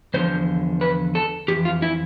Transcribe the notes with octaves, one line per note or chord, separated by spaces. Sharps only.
E2 D3 F3 C5
B4
A4
F2 E3 G4
F4
E4